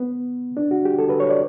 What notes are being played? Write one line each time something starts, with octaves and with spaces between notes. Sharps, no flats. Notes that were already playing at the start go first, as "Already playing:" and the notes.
Already playing: B3
D4
F#4
G4
A4
B4
C#5
D5